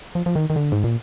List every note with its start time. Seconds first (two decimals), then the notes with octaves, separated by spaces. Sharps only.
0.15 F3
0.26 F3
0.36 D#3
0.50 D#3
0.56 D3
0.72 G#2
0.84 A#2